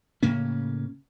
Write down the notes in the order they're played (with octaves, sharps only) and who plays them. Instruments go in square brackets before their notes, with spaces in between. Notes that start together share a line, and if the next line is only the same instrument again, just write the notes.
[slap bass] A2 C#3 A#3 C#4